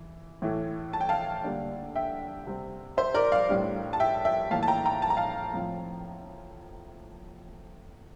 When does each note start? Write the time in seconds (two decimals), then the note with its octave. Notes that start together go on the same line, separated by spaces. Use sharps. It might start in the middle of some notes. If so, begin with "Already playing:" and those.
Already playing: E3
0.42 A2 E3 A3
0.93 A5
1.01 G5
1.09 F5 A5
1.44 D3 G3 A#3 D4
1.95 E5 G5
2.47 C3 G3 C4
2.97 C5 E5
3.14 A#4 D5
3.32 D5 F5
3.49 A2 G3 D4
3.93 A5
4.00 E5 G5
4.25 E5 G5
4.51 A2 E3 A#3 F5 A5
4.63 A5
4.68 G5 A#5
4.85 G5 A#5
5.02 A5
5.10 A#5
5.17 F5 A5
5.54 A2 F3 C4